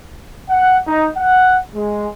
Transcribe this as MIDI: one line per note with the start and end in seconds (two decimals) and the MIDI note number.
0.49 0.76 78
0.87 1.05 63
1.16 1.57 78
1.75 2.07 56